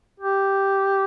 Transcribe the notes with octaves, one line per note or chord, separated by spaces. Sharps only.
G4